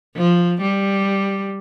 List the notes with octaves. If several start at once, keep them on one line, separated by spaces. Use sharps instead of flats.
F3
G3